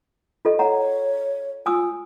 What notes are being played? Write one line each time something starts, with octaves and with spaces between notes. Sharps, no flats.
F4 A4 D#5
C#5 F#5 A#5
F4 G#5 D#6 E6